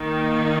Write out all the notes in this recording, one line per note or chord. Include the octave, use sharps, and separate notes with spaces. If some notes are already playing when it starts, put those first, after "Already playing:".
Already playing: D#3 A#3 D#4